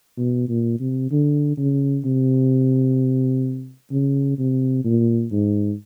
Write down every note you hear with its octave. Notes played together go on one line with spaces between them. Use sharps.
B2
A#2
C3
D3
C#3
C3
C#3
C3
A#2
G#2